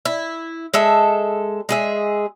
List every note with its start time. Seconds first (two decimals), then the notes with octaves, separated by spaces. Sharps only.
0.05 E4
0.74 G#3 A4 E5
1.69 G#3 G#4 E5